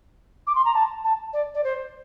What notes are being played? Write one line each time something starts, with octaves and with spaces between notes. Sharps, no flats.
D6
C6
A#5
A5
A5
D5
D5
C5